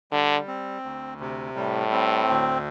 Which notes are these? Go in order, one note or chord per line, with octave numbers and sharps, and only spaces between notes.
D3 G3
C4
D2
C3
A2 G3
C4
D2